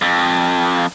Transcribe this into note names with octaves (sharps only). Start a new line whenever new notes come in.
F2